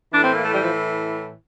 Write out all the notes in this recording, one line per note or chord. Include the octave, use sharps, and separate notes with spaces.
A2 E3 D4
C4
A#3
A3
G3
F3